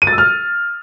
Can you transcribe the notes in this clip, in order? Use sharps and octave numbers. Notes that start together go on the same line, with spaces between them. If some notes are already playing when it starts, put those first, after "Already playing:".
D#7
A6
E6
F6